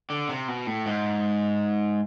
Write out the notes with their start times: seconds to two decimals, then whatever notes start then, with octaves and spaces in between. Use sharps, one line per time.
0.10 D3
0.29 C3
0.48 B2
0.67 A2
0.86 G#2